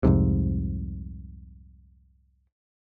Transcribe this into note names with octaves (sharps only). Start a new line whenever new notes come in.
C2 F2 G#2 C3